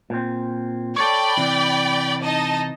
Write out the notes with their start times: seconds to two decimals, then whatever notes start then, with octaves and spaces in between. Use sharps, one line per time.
0.10 A#2 C4
0.96 A4 C#5 D5 G5 B5
1.37 C3 E3
2.22 D#4 D#5 A5